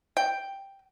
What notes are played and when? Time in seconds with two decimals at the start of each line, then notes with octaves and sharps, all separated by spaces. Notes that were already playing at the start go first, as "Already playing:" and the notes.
0.17 G5